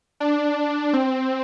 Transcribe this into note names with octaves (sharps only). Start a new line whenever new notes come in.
D4
C4